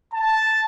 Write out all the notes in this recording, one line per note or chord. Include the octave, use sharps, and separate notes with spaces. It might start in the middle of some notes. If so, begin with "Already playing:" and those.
A5